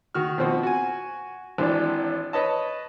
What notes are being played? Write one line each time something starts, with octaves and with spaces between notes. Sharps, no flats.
D#3 F#4 F6
B2 F3 C4 F#4
F#4 G#5
G#1 E3 C4 D4
B4 C#5 D#5 A5